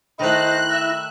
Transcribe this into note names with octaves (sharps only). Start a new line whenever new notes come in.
D#3 A3 D#4 E4 C5 F#6 A#6
E5